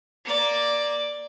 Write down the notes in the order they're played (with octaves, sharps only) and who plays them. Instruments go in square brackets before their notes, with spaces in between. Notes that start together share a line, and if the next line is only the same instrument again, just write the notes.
[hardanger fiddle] A#3 D5